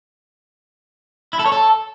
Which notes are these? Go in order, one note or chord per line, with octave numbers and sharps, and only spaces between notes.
E4
A4
C#5
A4